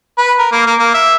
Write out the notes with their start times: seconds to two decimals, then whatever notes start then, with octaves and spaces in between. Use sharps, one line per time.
0.18 B4
0.39 A#4
0.52 A#3
0.67 A#3
0.79 A#3
0.94 E5